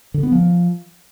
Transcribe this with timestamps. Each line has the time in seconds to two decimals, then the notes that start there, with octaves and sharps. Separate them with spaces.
0.14 D3
0.23 B3
0.32 F3